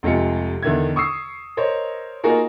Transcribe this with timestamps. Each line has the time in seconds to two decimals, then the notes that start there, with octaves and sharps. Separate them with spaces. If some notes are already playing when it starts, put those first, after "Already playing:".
0.03 F1 C3 G#3 F4 C#7
0.63 E2 D3 D#3 E5 G#6
0.96 C#6 D#6 E6 C7
1.57 A#4 C5 C#5 D#5
2.24 A#3 D#4 F4 F#4 G#4 A#4